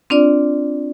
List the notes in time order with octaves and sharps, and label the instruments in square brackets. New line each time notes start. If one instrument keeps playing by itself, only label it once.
[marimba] C4 D4 F4 D5